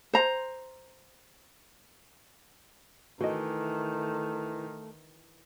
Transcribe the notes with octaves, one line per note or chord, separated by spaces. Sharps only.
C5 A#5
D#3 E3 A3 F#4 D#5